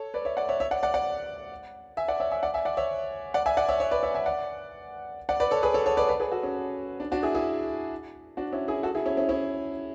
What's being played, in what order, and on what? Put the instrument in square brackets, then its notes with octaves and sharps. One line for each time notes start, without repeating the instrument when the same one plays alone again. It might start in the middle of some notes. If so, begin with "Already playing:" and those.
Already playing: [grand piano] A4 C#5
B4 D5
C#5 E5
D5 F#5
C#5 E5
C#5 E5
D5 F#5
D5 F#5
D5 F#5
E5 G#5
D5 F#5
C#5 E5
E5 G#5
D5 F#5
E5 G#5
D5 F#5
C#5 E5
D5 F#5
E5 G#5
D5 F#5
C#5 E5
C#5 E5
B4 D5
C#5 E5
E5 G#5
D5 F#5
D5 F#5
B4 D5
A4 C#5
G#4 B4
A4 C#5
A4 C#5
B4 D5
B4 D5
G#4 B4
F#4 A4
C#4
D4
D4 F#4
E4 G#4
E4 G#4
D4 F#4
C#4 E4
E4 G#4
F#4 A4
E4 G#4
C#4 E4
C#4 E4
C#4 E4